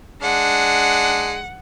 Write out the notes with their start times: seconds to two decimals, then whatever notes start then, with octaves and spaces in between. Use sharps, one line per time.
0.22 G#3 D4 F#5